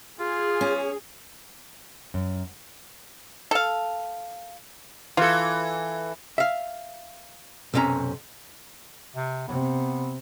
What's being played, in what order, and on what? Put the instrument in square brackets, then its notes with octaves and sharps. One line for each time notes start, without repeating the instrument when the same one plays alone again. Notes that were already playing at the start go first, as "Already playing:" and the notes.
[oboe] F4 [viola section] G#4
[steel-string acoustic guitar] C#4
F#2
[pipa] A4 F5
[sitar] E3 A4 [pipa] F4
[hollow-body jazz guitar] E5 F5
B1 F#2 C3 C#4 A#5
[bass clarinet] C3
[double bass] C3 [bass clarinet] B3